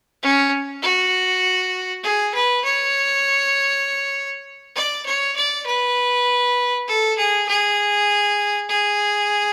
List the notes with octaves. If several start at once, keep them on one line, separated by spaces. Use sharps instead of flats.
C#4
F#4
G#4
B4
C#5
D5
C#5
D5
B4
A4
G#4
G#4
G#4